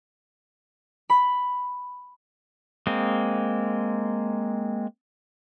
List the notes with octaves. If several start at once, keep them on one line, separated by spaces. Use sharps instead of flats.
B5
G#3 A#3 C4